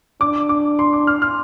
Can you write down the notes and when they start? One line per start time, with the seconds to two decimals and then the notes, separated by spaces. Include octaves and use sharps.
0.21 D4 D6
0.49 D6
0.79 C6
0.93 D6
1.07 F6
1.22 F6